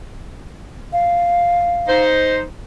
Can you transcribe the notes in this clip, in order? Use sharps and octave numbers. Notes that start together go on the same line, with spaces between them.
F5
D#4 C5